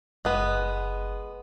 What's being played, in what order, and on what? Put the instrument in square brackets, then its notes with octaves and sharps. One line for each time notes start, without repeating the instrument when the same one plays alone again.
[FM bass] F#1 [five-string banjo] G#3 B3